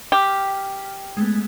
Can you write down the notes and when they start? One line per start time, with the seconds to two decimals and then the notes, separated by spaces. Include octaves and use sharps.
0.12 G4 G5 F6 B6
1.17 G#3 A3 B3